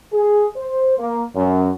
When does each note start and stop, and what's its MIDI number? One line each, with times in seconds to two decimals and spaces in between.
0.14 0.47 68
0.56 0.93 72
0.99 1.21 58
1.35 1.70 42